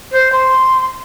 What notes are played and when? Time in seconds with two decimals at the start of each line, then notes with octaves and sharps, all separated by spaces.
0.11 C5
0.32 C6